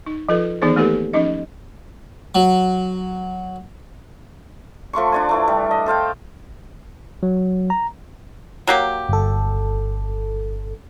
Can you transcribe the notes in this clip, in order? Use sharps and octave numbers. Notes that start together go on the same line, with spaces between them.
D#4
F3 F4 A4 B4
D#3 E3 B3 D#4 G#4 C5
A3 A#3 D#4 G4 A4 B4
F3 C#4 D#4 D#5
F#3
F3 A3 C6 C#6
D4 D5 G#5
E3 A3 D4
G3
D#5
A4 C5 F5 G5
F#3
A#5
F#3 A#3 G4
G1 A4